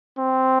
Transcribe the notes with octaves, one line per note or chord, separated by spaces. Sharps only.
C4